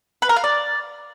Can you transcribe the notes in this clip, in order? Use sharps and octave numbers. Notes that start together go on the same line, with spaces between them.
B4
A#4
F5
D5